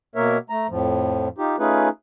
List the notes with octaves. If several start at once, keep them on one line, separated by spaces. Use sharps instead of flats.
B2 A#3 A#4 C#5 E5
A3 A#5
F2 A2 F3
D#4 F4 G4
A3 C#4 D#4 F4 G#4 B4